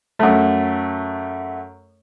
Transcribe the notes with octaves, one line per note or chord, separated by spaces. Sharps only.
F#2 A3